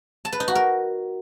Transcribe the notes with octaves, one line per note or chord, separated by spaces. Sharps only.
A5
B4
D#4
F#4
A#4